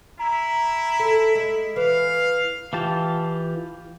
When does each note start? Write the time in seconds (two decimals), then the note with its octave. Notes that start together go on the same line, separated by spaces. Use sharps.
0.19 E4 A#5
1.00 A4
1.35 G#3
1.76 E3 B4 F5
2.73 E3 F4 G4 A5